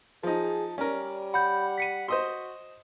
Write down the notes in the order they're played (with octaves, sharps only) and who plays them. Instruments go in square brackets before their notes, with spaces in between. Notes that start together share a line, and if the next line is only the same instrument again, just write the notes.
[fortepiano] F3 D#4 [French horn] G#4 [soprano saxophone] A5
[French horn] G3 [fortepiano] C#4 A#4 [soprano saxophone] D5
[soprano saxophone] F#5 [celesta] B5 G6
[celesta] B6 C#7 D#7
[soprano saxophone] F#4 [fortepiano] C5 D#5 C6